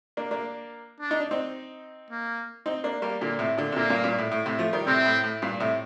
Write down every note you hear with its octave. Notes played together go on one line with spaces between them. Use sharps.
A#3 D4
A#3 D4
D4
D#4
D4
C4 D#4
A#3
C4 D#4
A#3 D4
G3 A#3
A#2 D3 A#3
A2 C3
A#2 D3
C3
A#2 D3 A#3
G2 A#2
G2 A#2
A2
A2
A2 C3
F3 A3
D#3 G3
A2 C3 C4
A2
A2
G2 A#2
A2 C3